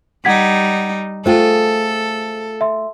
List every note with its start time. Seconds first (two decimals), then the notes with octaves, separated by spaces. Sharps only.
0.25 G3 D#4 F#5 G#6 B6
1.26 A3 F4 G#4 A4 C5 G5
2.61 E5 C6